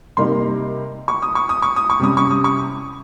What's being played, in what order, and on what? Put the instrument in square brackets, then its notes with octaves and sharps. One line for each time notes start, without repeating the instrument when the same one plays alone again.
[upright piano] C3 G3 A#3 D#4 C6
C#6
D#6
C#6
D#6
C#6
D#6
C#6
C3 G3 C#4 D#6
C#6
D#6
C#6